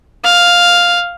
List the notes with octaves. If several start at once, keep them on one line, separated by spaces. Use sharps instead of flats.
F5